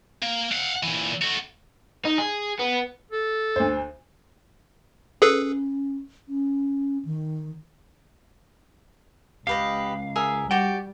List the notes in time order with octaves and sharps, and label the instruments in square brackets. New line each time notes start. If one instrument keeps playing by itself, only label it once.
[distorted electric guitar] A#3
F5 F#5
A#2 E3
A3 F#4
[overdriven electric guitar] D#4
G#4
B3
[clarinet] A4
[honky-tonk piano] D2 C5
[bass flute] C#4 [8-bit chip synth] G#4 A4 B4
[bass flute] C#4
D#3
[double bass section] C#2 [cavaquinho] G4 B4 D#5 [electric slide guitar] F5
[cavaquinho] G#4 A#4 E5
[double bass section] G3 [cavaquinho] F#4 G4 D5 [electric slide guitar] G5